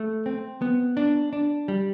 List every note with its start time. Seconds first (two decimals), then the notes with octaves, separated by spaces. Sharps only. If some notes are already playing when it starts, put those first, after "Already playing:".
Already playing: A3
0.26 C4
0.62 B3
0.97 D4
1.33 D4
1.68 G3